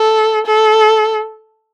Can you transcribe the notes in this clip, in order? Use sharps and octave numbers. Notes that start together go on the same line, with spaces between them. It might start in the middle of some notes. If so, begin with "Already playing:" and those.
Already playing: A4
A4